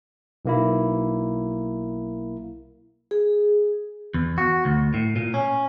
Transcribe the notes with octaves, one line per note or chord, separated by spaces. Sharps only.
B1 A#3 E4
G#4
E2
F#4
D2
A2
A#2
C#4